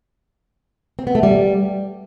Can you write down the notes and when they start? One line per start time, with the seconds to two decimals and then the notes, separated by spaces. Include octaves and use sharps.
0.99 C4
1.07 B3
1.15 A3
1.23 G3